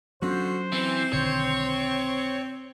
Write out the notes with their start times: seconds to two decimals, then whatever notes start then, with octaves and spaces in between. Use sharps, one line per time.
0.22 D3 F#3 B3 C#4 F4 F#4 C5
0.72 E3 C4
1.13 B1 D3 D#3 C#5